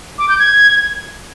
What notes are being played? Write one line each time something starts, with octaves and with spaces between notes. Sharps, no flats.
D6
G6
G#6